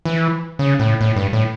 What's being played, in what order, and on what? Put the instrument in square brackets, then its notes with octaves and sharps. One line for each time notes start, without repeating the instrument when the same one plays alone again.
[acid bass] E3
C#3
A2
A2
G2
A2